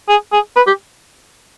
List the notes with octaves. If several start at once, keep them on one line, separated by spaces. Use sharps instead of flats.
G#4
G#4
B4
G4